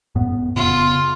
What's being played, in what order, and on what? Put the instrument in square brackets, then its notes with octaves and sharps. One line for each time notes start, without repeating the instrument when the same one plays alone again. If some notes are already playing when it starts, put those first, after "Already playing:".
[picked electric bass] F#2 A2 B3
[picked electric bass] F1 C#3 B3 [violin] F4